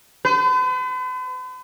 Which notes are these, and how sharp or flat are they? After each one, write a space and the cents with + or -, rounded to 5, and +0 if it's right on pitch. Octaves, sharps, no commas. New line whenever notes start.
B4 +45